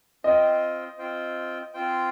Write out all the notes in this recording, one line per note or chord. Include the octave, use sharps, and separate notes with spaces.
C4 F4 C5 D#5 G5
C4 F4 C5 G5
C4 F4 C5 G5